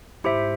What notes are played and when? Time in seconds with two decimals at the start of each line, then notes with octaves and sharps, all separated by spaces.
0.24 G#2 E4 G4 C5 E5